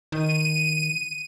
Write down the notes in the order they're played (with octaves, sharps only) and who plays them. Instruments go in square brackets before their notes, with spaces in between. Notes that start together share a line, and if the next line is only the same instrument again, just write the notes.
[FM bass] D#3 [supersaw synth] D#7